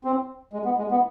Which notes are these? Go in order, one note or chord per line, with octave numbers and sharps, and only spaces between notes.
C4
G#3
B3
G#3
B3